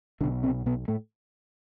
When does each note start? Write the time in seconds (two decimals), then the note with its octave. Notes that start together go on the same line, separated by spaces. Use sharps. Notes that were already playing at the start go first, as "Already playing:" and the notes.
0.21 B1 D3 D4
0.24 B2
0.43 C3 C4
0.66 B2 B3
0.88 A2 A3